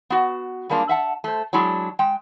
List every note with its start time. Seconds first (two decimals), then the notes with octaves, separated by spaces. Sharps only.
0.10 B3 F#4
0.69 G3 G#3 A#3 D4 F4
0.89 E5 F#5 A5
1.24 A3 C5
1.53 F#3 G#3 D4 E4 G#4 D5
1.99 G#3 G5